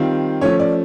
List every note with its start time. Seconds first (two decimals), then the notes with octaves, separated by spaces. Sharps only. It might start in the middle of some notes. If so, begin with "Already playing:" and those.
Already playing: D#3 G3 C4 F4
0.41 F3 A3 C#4 C#5
0.59 D5